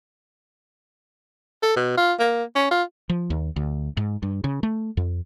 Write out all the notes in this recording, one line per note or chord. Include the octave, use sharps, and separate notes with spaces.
A4
B2
F4
A#3
C#4
F4
F3
D#2
D2
G#2
G2
C#3
A3
F2